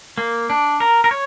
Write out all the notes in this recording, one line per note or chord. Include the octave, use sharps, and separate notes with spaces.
A#3
D4
A#4
A#4
C#5